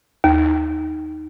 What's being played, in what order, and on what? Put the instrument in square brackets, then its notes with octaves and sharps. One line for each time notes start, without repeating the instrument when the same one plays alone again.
[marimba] D#2